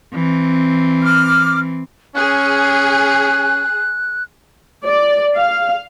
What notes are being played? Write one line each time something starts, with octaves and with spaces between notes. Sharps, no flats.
E3 C4
D6 F6
C#4 G#4 F#6
D5
F5